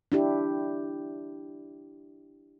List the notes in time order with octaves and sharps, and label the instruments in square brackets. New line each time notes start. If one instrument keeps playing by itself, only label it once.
[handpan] D4 E4 G4